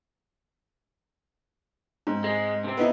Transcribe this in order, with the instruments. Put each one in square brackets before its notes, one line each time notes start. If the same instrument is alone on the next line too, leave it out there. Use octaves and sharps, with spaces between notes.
[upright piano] G#2 C4
[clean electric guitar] G#3
C3 C4
[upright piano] B3 D#4 E4